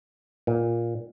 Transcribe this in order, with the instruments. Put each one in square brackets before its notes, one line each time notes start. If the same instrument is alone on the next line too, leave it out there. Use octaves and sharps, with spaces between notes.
[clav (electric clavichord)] A#2